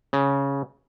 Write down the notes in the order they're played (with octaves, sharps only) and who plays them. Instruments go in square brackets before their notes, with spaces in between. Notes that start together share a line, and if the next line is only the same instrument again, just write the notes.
[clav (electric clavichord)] C#3